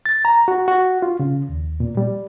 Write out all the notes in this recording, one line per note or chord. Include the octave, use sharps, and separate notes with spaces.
A6
A#5
F#4
F#4
F4
C#3
D#2
A#2
G3